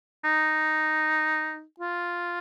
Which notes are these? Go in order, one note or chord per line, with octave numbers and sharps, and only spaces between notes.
D#4
F4